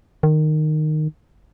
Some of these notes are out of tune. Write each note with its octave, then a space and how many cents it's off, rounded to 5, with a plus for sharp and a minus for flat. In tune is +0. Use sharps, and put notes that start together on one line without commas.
D#3 -15